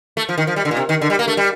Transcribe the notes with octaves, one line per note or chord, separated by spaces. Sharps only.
A3
F3
D#3
F3
G3
D3
A#2
C3
D#3
D3
G3
A#3
A3
G3